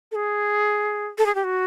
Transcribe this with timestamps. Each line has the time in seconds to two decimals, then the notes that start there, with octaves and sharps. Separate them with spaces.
0.11 A4
0.15 G#4
1.18 A4
1.26 G#4
1.35 G4
1.44 F#4